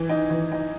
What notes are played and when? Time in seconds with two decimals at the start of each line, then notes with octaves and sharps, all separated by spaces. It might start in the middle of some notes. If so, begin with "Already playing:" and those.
Already playing: E3
0.09 D#4
0.30 E3
0.52 D#4